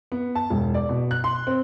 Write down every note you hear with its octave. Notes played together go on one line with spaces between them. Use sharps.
B3
A5
E1
D5
B2
F#6
C6
C4